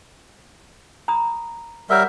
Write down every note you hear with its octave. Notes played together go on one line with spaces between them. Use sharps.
A#5 B5 D#6
G3 A#4 C#5 E5 F#5 C#6